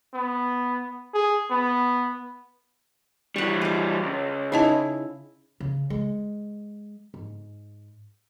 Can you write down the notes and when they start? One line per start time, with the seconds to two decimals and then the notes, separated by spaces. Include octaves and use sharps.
0.14 B3
1.14 G#4
1.51 B3
3.36 E3 G3 F#5 C#6
3.61 G#4 D6
4.03 C#2
4.52 C#3 D#4 E4 D#5 A5
5.60 C#3
5.90 G#3
7.14 G#2